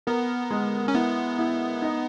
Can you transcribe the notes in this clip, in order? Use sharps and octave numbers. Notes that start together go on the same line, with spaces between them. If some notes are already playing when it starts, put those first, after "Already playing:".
B3 A#4
G#3
C#4
B3 E4
E4
D#4